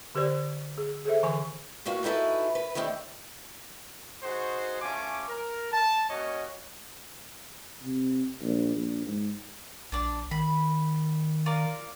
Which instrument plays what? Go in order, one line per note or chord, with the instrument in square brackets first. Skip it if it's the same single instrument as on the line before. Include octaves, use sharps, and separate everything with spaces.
[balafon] D3 G4 A#4 C5 D5
G#4
G#4 A4 C5 E5
D3 E3 G#5 C#6
[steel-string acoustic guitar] A2 A#3 F#4 B4 F5
D#4 E4 F#4 G#4 A4 B4
B4
D#3 G3 A3 C4 D4
[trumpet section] D#4 F#4 G#4 C5
A3 C#4 F4 G#5 D6
A#4
A5
A#3 C#4 F#4 C#5 D#5
[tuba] C3
A#1
A#1
G#2
[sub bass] A#1 [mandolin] D4 D5
[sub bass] D#3 [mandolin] B5
[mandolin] F4 A#4 D5